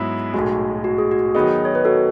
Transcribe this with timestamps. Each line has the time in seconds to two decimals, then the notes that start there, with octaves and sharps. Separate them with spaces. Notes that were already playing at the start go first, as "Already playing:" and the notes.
Already playing: G#2 F#3 B3 E4 G#4
0.34 B1 A2 G#3 F#4
0.84 F#4
0.98 G#4
1.11 F#4
1.35 D#3 F#3 B3 D#4 G#4
1.65 C#5
1.75 B4
1.85 F#4 A4